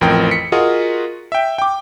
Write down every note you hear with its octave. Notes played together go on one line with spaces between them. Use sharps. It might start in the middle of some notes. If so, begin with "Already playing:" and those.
A1 F2 A#4 G5
B6 C#7
F4 F#4 G#4 A#4 D#5 F#5
E5 G5
G5 D6